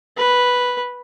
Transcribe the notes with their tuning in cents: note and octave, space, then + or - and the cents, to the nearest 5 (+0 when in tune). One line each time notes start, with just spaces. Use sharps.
B4 -5